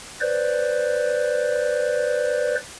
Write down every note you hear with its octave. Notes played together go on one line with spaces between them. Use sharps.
B4 C5 D5